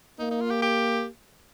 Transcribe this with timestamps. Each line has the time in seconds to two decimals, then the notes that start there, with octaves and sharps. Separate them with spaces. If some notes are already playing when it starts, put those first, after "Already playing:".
0.19 A#3 D#4
0.31 D#4
0.41 F4
0.51 G4
0.62 G4